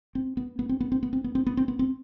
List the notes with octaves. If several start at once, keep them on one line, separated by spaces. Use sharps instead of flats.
C4
B3
B3
C4
B3
C4
B3
C4
B3
C4
B3
C4
B3
C4